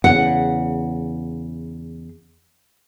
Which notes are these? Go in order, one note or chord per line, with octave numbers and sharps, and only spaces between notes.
E2 C#3 F#5